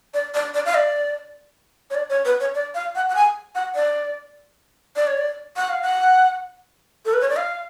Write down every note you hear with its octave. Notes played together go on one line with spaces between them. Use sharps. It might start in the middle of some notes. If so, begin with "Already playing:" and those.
D5
D5
D5
F5
D5
C#5
D5
C#5
B4
C#5
D5
F5
F#5
F#5
G#5
F#5
D5
D5
C#5
D5
F#5
F5
F#5
A4
B4
C#5
D5
F5